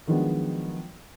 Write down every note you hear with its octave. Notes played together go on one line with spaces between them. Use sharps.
D#3 F3 F#3 G#3 B3 D4